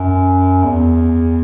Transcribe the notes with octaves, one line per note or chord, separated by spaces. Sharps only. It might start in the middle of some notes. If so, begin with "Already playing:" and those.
Already playing: F#2
E2